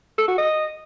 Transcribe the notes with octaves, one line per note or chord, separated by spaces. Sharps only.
A4
F#4
D#5